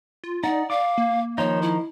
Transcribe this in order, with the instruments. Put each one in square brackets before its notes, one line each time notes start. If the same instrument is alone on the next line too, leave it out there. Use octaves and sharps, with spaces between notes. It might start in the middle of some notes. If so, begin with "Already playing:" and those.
[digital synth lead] F4
[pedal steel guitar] D#4 [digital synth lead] D5 [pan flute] F#5
[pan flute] F5 [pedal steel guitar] D6
[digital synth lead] A#3
[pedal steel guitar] D#3 F3 D#4 [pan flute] C#5
[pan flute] E4